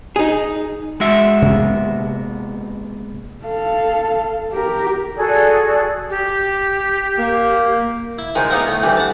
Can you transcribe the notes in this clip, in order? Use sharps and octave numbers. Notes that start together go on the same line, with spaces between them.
D#4 G#4
G#3 F#4 E5
C3 A#3 B3
A4 F5
G4 A#4
F#4 G#4 A4 D5
G4
A#3
E4
D#3 F3 G#3
A#3 B3 D#4 E4 A#4
A2
D2 E3 G3
F#5 A5